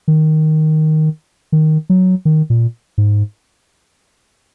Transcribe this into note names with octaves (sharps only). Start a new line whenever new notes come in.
D#3
D#3
F#3
D#3
A#2
G#2